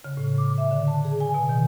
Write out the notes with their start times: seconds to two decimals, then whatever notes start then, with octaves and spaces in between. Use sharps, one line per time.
0.04 C#3
0.17 A2
0.38 D6
0.58 E5
0.71 D3
0.88 A5
1.05 G#4
1.20 G#5
1.34 B2
1.49 D#3